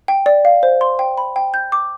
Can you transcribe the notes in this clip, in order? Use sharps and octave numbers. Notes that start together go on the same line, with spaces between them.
G5
D5
F5
C5
C6
G5
B5
G5
G6
D6